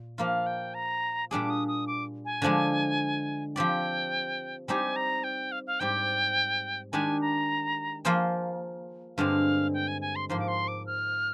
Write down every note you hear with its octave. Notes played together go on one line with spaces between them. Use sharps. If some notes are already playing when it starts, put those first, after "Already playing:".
Already playing: A#2
F3 A#3 F4 F5
G5
A#5
A#2 G3 D4 G#4 D6
D#6
D#6
D6
G#5
D3 F3 G#3 D4
F3 C4 G4 D5 G5
G3 C4 D#4 G4 G#5
A#5
G5
F5
F5
G#2 G3 C4 G4 G5
D#3 G#3 D4 G4 G#5
A#5
F3 A#3 F4 G#4 C5
G2 D3 G#3 C4 F5
G5
G#5
G#5
C6
G#2 F3 A#3 C6
D6
C6
D6
F6